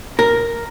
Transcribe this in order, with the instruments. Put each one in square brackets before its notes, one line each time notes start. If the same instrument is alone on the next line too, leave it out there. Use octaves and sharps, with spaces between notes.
[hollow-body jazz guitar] A#4